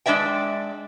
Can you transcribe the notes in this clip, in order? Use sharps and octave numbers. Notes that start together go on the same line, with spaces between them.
G#3 D4 D5 E5 G5